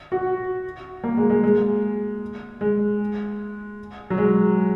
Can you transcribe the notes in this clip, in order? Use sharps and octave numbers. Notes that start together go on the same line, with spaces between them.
F#4
A#3
G#3
G#3
G#3
G#3
F#3
G#3